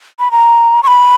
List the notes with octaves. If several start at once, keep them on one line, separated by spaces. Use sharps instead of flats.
B5
A#5
C#6
B5